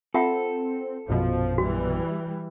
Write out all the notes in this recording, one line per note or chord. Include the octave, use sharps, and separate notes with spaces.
C4 F4 A4 E5 F#5
A#1 F#2 B2 F3
E3 G3 F#4